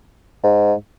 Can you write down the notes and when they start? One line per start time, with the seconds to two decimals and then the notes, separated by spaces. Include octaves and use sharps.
0.43 G#2